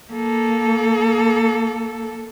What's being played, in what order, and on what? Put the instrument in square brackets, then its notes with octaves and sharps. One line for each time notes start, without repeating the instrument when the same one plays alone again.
[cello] A#3 A4